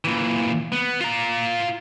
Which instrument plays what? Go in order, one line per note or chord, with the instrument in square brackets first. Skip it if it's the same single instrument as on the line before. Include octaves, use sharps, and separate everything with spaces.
[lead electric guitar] A#2 E3
B3
F4 A#5